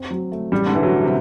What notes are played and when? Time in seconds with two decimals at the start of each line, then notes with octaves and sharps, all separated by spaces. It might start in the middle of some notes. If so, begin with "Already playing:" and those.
Already playing: C4
0.10 F#3
0.32 A3
0.52 A1 G3
0.66 D3
0.72 G2 E3
0.83 F#3
0.93 F#3
1.02 C3